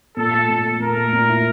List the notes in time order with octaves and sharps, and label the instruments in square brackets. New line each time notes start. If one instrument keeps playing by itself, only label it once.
[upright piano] A#2 [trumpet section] A4
[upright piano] A3
A#2
A3
[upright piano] A#2 [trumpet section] A#4
[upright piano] A3
A#2
E4